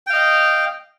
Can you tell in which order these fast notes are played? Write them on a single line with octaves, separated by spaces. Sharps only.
G5 F5 D#5